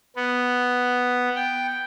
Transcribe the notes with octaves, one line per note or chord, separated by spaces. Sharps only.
B3
G5